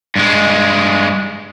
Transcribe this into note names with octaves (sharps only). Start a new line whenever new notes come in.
G2 G#3